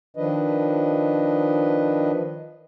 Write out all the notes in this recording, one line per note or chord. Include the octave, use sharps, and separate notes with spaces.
D#3 F3 D4 B4 D#5